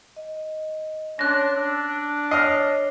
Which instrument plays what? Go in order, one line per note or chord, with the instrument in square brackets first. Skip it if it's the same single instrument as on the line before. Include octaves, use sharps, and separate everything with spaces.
[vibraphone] D#5
[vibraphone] C#4 C#5 C6 [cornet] D4 [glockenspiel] F#6 A#6
[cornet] D4 [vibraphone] E6
[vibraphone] C#5 [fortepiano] D#5 D#6 F6 [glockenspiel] C7